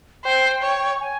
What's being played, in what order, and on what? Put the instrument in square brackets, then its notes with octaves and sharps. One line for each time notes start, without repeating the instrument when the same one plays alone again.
[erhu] C5 [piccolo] G5
[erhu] C#5
[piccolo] G#5